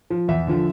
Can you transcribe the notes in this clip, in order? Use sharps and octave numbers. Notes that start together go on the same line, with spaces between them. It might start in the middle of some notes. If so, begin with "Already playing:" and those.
F3
E2 E5
D3 F3